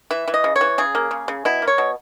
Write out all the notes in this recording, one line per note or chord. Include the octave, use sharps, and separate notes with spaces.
E3 E5
E3
D#5
C#3
C#5
E3
C#3 G#4
A#3
C#3
C#3
B2 E4
A#3
C#5
B2